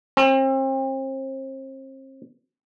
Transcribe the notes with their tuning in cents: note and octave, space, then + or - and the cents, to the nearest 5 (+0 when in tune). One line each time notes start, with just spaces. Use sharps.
C4 +40